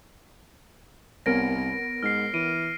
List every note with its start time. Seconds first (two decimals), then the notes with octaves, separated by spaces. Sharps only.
1.26 C2 B3 A#4 C#5 A#6 D7
2.03 G#2 F6 C7
2.34 E3 D7 D#7